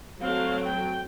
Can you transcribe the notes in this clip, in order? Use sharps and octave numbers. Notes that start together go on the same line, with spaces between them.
F#3 A3 C4 F5
G5